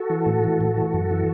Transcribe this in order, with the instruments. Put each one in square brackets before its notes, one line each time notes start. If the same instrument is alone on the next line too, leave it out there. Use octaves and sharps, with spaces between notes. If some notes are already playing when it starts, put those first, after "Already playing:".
Already playing: [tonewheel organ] F#4 A4
E3
A2
E3
A2
E3
F#2
E3